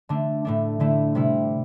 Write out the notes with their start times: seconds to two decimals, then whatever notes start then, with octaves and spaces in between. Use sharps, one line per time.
0.09 D3 A3 D4
0.45 A2 A3 D4
0.80 D3 A3 E4
1.15 C3 G3 E4